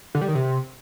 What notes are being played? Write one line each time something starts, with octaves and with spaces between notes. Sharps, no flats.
D3
G3
D#3
C3